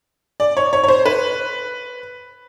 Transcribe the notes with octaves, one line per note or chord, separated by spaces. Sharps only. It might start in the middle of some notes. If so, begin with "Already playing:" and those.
D5
C#5
C#5
C#5
C5
B4